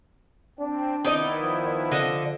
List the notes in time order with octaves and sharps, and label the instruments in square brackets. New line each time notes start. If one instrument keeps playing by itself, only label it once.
[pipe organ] C4 [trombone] D4
[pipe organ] D#3 B3 E4 [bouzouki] D#4 D5 D#5
[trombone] F3
[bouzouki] D3 D#5 E5